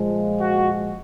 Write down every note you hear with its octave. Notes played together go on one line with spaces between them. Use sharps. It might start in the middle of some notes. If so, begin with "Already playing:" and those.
Already playing: A#2 F3 G#3
F#4